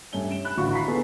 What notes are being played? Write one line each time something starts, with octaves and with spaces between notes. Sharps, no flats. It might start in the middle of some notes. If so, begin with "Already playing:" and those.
G2 A3 C#4 G7
D7 E7
B5 F#6
A1 D3 F4 F#4 B5 C#6
A#5 B5 C#6 B6 C7
B3 G#4 A4 B4